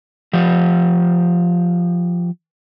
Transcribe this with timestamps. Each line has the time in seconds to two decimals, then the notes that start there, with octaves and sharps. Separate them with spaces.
0.33 F3 G4